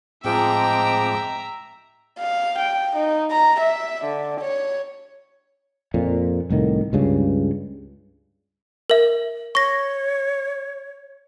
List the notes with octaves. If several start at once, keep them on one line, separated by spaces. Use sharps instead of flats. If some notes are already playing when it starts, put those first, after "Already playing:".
A2 F3 G#3 C4 E5 G5 A#5 D6
F5
G5
D#4
A#5
E5
D3
C#5
F2 A#2
C2 A2 D#3
C#2 G2 C#3
A#4 E5
C#5 C#6 A#6